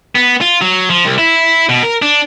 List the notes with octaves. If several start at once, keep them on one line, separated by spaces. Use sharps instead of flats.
B3
F4
F#3
F3
C2
E4
B2
A#4
D4